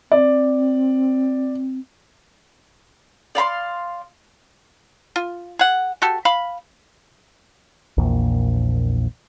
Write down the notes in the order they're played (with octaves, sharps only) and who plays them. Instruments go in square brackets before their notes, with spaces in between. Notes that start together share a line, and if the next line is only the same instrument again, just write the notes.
[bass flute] C4 [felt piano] D5
[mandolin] D5 F5 B5 C6
[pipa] F4
G#4 F#5
F#4 G4 A4
F5 B5
[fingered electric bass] A#1 E2 A#2